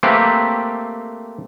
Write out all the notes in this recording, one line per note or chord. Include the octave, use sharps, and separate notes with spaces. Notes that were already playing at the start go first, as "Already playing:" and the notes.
A3 A#3 C4 G4 B4